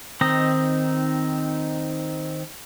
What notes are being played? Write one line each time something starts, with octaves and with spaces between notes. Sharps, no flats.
D#3 C4 D#4 D#5